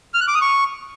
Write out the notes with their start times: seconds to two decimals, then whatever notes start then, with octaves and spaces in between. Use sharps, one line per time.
0.14 F6
0.21 F#6
0.28 D6
0.34 D#6
0.41 C#6